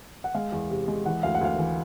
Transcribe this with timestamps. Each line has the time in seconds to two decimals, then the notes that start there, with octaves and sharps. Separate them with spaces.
0.24 F#5
0.34 G#3 F5
0.52 E2
0.70 C3
0.88 G#3
1.05 E3 F#5
1.23 D2 F5
1.35 F#5
1.41 D2 F5
1.59 E3